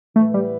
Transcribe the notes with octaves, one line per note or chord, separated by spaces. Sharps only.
A2 E3 A3 B3 E4 B4
G3